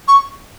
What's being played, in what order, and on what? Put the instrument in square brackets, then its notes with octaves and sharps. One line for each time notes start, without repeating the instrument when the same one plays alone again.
[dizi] C#6